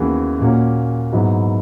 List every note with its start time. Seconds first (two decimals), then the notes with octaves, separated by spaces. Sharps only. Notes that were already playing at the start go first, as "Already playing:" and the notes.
Already playing: D#2 C#3 E3 B3 F#4
0.40 A#2 A#3 C#4 F#4
1.13 G#2 F#3 B3 E4